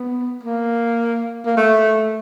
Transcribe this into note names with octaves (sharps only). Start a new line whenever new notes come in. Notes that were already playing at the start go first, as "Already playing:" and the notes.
Already playing: B3
A#3
A#3
A3